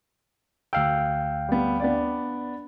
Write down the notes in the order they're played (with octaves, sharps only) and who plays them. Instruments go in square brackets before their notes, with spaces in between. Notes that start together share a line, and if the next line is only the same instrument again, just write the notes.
[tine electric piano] D2 F5 G5 [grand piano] E6
[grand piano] G3 B3
B3 D4 D5